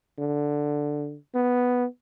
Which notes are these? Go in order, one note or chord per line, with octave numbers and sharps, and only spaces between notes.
D3
B3